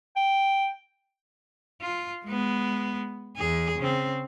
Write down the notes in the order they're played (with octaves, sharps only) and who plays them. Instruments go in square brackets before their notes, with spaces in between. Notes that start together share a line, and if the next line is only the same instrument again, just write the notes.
[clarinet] G5
[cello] F4
G#3 B3
E2 G#4
C#3 C4